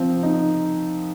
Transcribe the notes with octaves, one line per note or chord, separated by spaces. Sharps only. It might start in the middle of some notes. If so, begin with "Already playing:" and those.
Already playing: F3 C4
D#4